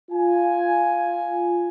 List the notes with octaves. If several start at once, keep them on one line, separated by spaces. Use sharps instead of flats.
F4 G#5